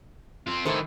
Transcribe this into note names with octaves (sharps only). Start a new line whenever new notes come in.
C4 F4
A2 D#3 E4 A4 C5